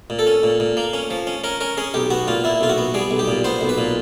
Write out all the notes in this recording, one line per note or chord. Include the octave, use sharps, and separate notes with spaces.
A#2
A4
C#4
A#2
A#2
A#3
C#4
F3
C#4
C#4 A#4
C#4 A#4
C#4 G#4
B1 G4
B3 F#4
A#2 F4
A#2 E4
B1 F4
F#4
B3
G3 G#4
B1
G4
A#2
B3 C5
B1
B4
A#2